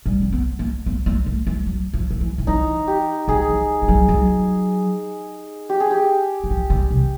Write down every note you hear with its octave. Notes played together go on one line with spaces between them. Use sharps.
G3
C4
B3
A#3
B3
A#3
A3
G#3
F#3
F3
D#3
E3
D#3
E3 D#4
G4
D#3 G#4
E3
F3
F#3
F#3
G4
G#4
G4
E3
F3
D3
C3